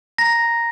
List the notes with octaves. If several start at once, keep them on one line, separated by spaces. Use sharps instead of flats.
A#5 A#6
A#5